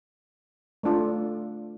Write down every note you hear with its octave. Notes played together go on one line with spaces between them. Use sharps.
A3 D4 F4 A4